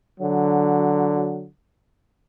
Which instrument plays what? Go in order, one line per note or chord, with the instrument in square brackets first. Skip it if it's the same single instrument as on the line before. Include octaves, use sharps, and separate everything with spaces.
[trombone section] D3 F#3